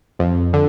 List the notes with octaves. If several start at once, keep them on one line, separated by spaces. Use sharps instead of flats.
F2
D3